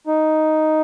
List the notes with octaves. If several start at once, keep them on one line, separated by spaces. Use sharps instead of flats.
D#4